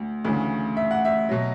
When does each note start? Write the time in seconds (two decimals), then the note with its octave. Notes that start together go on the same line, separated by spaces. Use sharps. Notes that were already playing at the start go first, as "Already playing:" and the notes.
Already playing: D2
0.25 D2 C#3 E3
0.77 E5
0.91 F#5
1.05 E5
1.29 B2 F#3